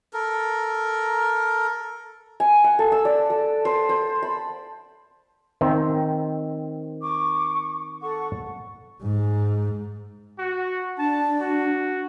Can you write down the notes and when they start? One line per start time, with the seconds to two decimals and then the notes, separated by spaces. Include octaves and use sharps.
0.13 A4 A#4
2.40 G#5
2.64 F#5
2.79 A4
2.92 E6
3.05 D5
3.30 A4
3.65 C5
3.89 C5
4.23 B5
5.61 D#3 C4
7.01 C#6 D6
8.01 A4 F#5 C#6
9.02 G#2
10.39 F#4
10.98 D4 A5
11.41 F#4